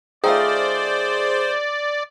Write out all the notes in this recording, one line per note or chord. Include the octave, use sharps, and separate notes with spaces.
D#3 A3 F4 G#4 C5 D5